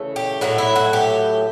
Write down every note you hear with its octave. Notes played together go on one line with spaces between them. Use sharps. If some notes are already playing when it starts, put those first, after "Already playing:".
Already playing: C#3 E3 A3
G4
A2 F#3 A3 F#4
E4
F#4
G4